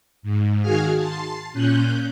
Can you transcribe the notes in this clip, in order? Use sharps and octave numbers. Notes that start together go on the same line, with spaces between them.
G#2
D#3 F#4 G#4 F5 G#5 F6
A5 C6
A#2 C#4 F#6 G6